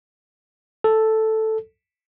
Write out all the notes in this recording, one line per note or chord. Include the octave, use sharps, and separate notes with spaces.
A4